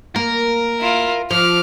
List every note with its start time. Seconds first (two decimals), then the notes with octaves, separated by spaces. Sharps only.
0.16 A#3 A#4
0.80 E4 F4
1.31 F3 D6 F6